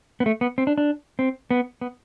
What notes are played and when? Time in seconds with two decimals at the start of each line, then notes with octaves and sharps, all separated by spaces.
0.20 B3
0.26 A3
0.41 B3
0.58 C4
0.67 D4
0.78 D4
1.19 C4
1.51 B3
1.81 B3